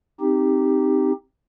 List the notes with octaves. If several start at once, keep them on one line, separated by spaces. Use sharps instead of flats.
C4 D#4 G4